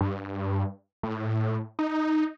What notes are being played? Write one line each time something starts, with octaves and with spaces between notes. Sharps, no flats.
G2
A2
D#4